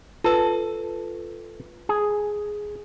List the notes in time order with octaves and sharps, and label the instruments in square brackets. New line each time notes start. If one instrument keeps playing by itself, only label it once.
[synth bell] F4 B4 [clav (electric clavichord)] A4
[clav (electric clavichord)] G#4